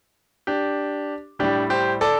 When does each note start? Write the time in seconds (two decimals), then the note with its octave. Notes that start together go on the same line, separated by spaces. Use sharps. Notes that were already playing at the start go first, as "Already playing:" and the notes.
0.47 D4 G4
1.39 A2 G3 D4 G4
1.70 G4 C5
2.01 A4 D5